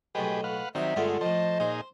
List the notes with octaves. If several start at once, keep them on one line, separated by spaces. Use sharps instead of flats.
B1 A2 G#3 G4 G#4 B4
B4 F5 F#5
D#3 F#3 G3 C4 E5 D#6
G2 D3 G#3 A3 B3 F4
A2 F3 C5 D#5 A5
A#2 D#4 G#4 C5